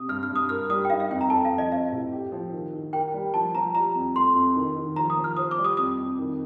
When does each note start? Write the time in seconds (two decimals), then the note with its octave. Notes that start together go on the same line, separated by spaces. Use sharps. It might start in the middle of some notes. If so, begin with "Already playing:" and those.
Already playing: C3 D#6
0.08 G2 F6
0.23 F6
0.30 G2
0.36 D#6
0.49 A#4 F6
0.70 G3 D#6
0.85 G5
0.90 D#4 F5
1.00 F5
1.11 F2 G5
1.21 A#5
1.30 A4 A5
1.45 F5
1.51 F3
1.58 D#5
1.71 C4 F5
1.92 A2
2.12 G4
2.32 F3
2.52 D#3
2.73 D#3
2.93 A#4 G5
3.14 G3
3.34 F3 A5
3.55 F3 A#5
3.75 G3 A#5
3.95 F2
4.15 A3 C6
4.35 F2
4.56 D#3
4.76 D#3
4.96 F3 A#5
5.10 D#6
5.17 F3
5.24 F6
5.37 C5 D#6
5.51 D6
5.58 G3
5.64 D#6
5.77 F2 D#6
5.98 F2
6.19 D#3